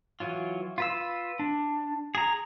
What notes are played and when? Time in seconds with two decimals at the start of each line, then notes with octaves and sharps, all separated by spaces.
0.20 E3 F#3 F4
0.78 F4 B4 E6
1.39 D4
2.15 G#4 A#5